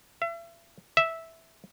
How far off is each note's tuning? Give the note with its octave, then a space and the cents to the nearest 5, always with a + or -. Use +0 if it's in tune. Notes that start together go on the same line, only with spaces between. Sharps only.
E5 +40
E5 -5